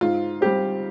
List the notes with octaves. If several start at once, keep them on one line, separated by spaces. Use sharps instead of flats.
G#2 F4
G3 C4 G4